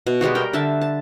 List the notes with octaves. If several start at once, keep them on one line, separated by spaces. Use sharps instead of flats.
B2
G3 G#3 B3 F#4
A#4 G5
D3 E5 A5
A5